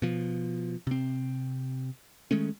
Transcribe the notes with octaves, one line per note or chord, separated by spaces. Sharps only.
B2 F3
C3 C4
D#3 G#3 A3 C#4